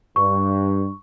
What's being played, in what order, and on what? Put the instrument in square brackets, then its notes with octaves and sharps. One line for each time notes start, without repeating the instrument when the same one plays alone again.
[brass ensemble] G2 [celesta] C#6